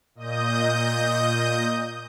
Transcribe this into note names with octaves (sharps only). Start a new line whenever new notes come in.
A#2 D#5 D#6 G6